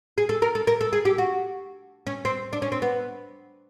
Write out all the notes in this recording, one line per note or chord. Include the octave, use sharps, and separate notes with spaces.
G#4
A4
A#4
A4
A#4
A4
G#4
G4
F#4
C#4
C4
D4
C#4
C4
B3